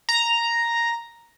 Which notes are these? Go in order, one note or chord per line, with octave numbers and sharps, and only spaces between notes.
A#5